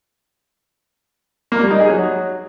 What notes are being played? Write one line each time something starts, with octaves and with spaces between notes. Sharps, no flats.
A#3
G3
D#4
G#4
F#3